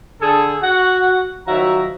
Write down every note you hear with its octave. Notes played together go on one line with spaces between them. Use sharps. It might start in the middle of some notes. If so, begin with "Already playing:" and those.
D3 G#4 A4
F#4 F#5
D#3 F3 F#3 F#4 E5 A#5